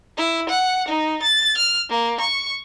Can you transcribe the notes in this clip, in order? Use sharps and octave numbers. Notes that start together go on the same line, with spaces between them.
E4
F#5
D#4
A6
F6
A#3
C#6